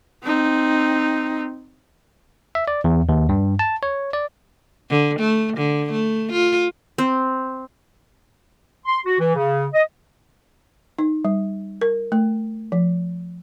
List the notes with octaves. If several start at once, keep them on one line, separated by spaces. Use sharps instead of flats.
C4 D#4
E5
D5
E2
D#2
G2
A5
C#5
D5
D3
A3
D3
A3
F4
C4
C6
F#4
E3
C#3
D#5
D#4
G3
A#4
A3
F3